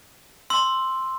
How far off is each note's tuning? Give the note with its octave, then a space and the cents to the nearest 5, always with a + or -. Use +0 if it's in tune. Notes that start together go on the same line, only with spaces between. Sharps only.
C6 +0 E6 +0